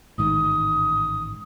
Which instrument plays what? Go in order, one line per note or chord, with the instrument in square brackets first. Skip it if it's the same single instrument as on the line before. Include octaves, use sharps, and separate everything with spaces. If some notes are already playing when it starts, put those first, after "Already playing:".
[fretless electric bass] A1 G#2 D#3 [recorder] D#6